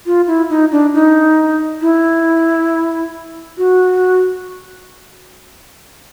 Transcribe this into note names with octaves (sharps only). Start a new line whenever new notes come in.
F4
E4
D#4
D4
D#4
E4
F#4